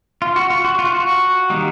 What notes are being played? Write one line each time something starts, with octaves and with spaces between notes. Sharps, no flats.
F4
F#4
F4
F#4
F4
F#4
D#3 G3 A#3 D#4